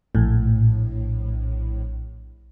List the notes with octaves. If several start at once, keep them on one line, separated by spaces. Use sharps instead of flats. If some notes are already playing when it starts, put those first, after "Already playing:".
A#1 A2